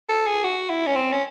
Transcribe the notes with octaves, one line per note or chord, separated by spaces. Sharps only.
A4
G#4
F#4
E4
C#4
C4
C#4